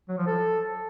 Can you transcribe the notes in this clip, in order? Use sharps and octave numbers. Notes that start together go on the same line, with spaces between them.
F#3
F3
A4